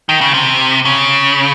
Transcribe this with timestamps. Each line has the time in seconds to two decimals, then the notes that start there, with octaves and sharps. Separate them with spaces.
0.09 D#3
0.21 C#3
0.34 C3
0.85 C#3